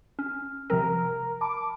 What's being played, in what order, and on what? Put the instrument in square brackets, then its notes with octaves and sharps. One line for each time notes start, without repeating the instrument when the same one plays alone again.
[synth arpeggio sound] C#4 [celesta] F6
[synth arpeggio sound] C3 F3 C4 [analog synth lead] A#4
[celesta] A5 B5 [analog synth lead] D6